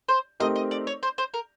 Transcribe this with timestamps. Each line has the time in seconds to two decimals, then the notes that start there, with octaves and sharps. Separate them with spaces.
0.09 C5
0.40 A3 C4 D#4 G4 A#4 D#5
0.56 D#5
0.71 D5
0.87 C#5
1.03 C5
1.18 C5
1.34 A#4